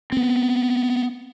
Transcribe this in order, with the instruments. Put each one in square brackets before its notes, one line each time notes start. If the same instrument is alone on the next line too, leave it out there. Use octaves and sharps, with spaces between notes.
[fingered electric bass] B3 C4